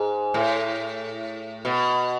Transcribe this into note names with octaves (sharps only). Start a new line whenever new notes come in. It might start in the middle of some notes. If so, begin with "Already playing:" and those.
Already playing: G#2
A2
B2